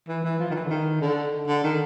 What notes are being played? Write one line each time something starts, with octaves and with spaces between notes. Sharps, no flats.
E3
E3
F3
D#3
E3
D3
D#3
D3
D3
D#3